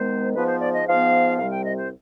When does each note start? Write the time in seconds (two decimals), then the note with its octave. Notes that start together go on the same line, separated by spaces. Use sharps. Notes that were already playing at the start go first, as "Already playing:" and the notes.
Already playing: C3 D#3 G#3 B3 C5
0.34 G#2 F3 B3 B4
0.47 C5
0.61 D5
0.73 D#5
0.86 G#2 F3 B3 F5
1.38 C2 C3 G3 F5
1.51 G5
1.65 D#5
1.76 C5